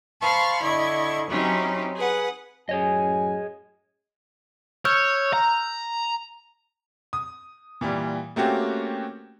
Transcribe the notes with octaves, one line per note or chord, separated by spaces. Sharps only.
C5 F5 A5 B5 C#6 F6
D3 E4 D#5 C#6 G#6
F#3 C4 C#4 D#4 E4 G4
G#4 B4 F#5
F#2 A2 G#4 C#5 D#5 G#5
C#5 E6 F6 G6
A#5
D#6
A#2 E3 G3
A3 A#3 C4 C#4 F#4 G4